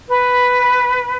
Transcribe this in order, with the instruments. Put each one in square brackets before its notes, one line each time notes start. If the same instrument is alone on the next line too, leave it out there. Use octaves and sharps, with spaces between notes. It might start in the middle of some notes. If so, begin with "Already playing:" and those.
[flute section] B4